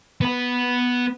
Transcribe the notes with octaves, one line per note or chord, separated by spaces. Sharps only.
B3 B4